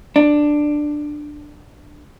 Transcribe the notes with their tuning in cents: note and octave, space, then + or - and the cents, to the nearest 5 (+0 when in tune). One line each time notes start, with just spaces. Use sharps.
D4 +10